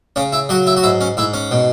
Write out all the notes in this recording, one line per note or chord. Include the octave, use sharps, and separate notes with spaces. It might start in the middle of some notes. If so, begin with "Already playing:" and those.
C#3 C#4
E4
F#3 F#4
E4
F#4
G#2 E4
C#4
G#2 E4
C#4
B2